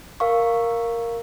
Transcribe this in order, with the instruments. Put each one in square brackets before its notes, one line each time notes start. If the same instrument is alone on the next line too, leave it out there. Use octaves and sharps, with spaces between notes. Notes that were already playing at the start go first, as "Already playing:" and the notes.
[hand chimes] A#4 F5 C#6